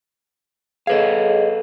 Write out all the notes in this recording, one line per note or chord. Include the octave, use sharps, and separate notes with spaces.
G#4 A4 B4 C#5 D#5 F5